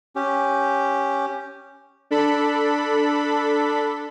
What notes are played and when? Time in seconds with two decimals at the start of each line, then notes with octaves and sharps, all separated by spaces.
0.16 C#4 G4
2.11 D4 A4 B5